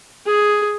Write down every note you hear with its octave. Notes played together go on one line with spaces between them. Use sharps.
G#4